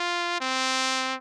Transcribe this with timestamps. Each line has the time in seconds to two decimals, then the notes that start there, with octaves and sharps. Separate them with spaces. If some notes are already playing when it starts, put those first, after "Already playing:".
Already playing: F4
0.41 C4